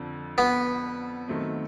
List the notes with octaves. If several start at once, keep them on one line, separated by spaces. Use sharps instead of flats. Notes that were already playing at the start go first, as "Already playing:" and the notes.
Already playing: F2 D3 F3
B3
D#3 F#3 A3 C4